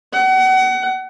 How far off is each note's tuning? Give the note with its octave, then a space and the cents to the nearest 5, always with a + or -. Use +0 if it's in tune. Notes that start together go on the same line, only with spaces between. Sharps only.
F#5 +30